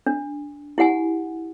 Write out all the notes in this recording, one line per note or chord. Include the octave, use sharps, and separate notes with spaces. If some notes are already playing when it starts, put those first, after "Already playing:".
D4
E4 G4 F#5 G#5